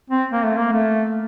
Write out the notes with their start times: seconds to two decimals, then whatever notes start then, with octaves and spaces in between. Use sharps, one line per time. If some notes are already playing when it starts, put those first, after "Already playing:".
0.10 C4
0.32 A#3
0.45 A3
0.57 A#3
0.73 A3